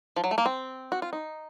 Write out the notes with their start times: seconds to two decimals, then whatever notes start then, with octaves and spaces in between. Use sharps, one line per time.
0.16 F3
0.24 F#3
0.31 A3
0.38 A#3
0.46 C4
0.92 F#4
1.02 F4
1.13 D#4